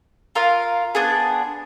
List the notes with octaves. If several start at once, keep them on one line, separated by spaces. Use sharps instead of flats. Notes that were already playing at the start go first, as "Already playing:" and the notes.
F4 A#4 F5
B3 D4 G#4